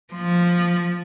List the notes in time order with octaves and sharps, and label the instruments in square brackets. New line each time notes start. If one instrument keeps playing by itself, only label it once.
[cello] F3